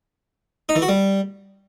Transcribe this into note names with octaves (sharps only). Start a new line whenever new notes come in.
D#4
E3
F#4
G3